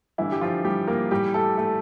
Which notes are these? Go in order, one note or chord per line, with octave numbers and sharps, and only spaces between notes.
G2 D3 E3 G3 E4
G4
F3 F4
G3 G4
A#3 A#4
A2 E3 G3 G4
A3 A4
A3 A4